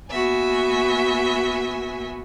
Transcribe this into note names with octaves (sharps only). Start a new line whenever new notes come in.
A#3 B3 F#4 E5 G#5